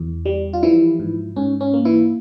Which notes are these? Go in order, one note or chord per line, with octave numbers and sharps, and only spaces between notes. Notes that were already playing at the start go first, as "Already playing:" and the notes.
Already playing: E2
G3
F4
E3 F3 E4
G#2
G#2 C#4
C#4
A#3
E3 E4